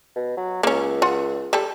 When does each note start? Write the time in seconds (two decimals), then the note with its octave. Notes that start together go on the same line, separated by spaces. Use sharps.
0.15 B2
0.37 F#3
0.63 C#2 A#3 C#4
1.02 F4 F#5
1.53 G3 A4